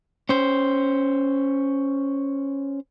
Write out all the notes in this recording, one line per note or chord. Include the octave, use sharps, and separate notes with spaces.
C#4 C5